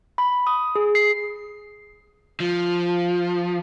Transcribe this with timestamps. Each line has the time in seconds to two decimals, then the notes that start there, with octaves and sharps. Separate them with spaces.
0.18 B5
0.47 D#6
0.75 G#4
0.95 C7
2.40 F3